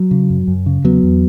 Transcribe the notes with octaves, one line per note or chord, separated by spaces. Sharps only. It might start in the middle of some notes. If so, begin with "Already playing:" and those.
Already playing: F#3
C#3
F#2
F#2
C#3
E2 F#3 B3
E2